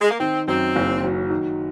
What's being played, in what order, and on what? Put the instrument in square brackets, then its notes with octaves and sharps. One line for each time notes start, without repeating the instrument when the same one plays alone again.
[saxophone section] G#3
A#3
[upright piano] D#3 [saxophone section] C4
[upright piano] F#2 [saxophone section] C4
[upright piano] F#1
F#3
D#3